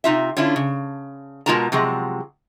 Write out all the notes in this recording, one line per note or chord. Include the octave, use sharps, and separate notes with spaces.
C3 D#4 F4 E5
D3 C#4 D4 E4 F4
C#3
B2 G#3 F4 A#4 A5 A#5
C3 F3 F#3 G#3